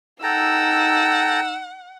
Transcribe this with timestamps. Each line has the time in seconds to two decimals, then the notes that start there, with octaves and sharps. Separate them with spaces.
0.23 D#4 A4 F#5 G5 A#5 E6